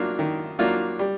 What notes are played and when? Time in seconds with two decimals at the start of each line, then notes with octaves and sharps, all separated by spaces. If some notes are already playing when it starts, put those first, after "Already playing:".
Already playing: F#3 A#3 D4 F4
0.19 D#3
0.59 F#3 A#3 D4 F4
0.99 G3